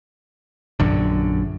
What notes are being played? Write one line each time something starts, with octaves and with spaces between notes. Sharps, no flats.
A#1 F#2 D3